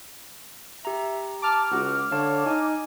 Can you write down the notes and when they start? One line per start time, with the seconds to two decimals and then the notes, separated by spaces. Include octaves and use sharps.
0.85 G4 E5 A#5
1.42 A5 D6 F6
1.71 C#2 F#4
2.12 D3 C#5 F5 A5
2.46 D#4 G#5